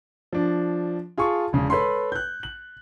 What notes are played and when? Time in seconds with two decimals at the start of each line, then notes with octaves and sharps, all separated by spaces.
0.32 F3 D4
1.18 F4 G#4 A5 C#6
1.53 E1 C#3
1.70 A4 B4 C#5 B5 C6
2.12 F#6 G6
2.43 F#7